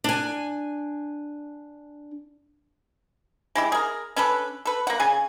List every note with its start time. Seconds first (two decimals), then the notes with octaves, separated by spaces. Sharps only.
0.04 D4 G#5
3.55 G#3 E4 G4
3.72 G#4 A#4
4.16 C#4 D4 A4 B4
4.65 A4 B4
4.87 A#3 F#5
5.00 C#3 G#4 G#5